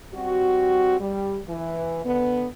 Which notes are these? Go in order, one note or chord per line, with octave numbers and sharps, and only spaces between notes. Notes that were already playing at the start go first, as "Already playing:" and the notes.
G3 C4 F#4
G3
E3
D3 B3